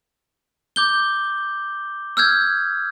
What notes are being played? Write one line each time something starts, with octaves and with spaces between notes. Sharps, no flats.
D6 G6 G7
E6 F6 G6 G#6